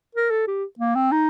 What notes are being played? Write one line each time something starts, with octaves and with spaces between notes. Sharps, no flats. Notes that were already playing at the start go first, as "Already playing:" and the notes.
A#4
A4
G4
A#3
C4
D#4